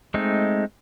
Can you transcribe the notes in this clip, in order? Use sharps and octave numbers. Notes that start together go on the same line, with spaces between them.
G#3 A3 C4 D#4